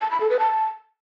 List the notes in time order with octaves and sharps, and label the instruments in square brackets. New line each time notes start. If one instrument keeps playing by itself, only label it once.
[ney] A5
B5
A4
B4
A5